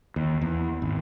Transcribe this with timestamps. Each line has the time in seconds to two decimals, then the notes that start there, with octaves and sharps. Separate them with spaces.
0.16 D#2
0.41 E2
0.82 G#1